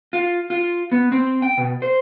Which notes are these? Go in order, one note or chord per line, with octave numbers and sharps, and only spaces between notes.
F4
F4
B3
C4
G5
B2
C5